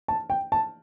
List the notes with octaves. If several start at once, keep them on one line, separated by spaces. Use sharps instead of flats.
A5
G5
A5